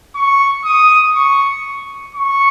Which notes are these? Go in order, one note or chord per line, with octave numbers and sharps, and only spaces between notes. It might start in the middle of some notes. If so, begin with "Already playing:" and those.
C#6
D#6
C#6
C#6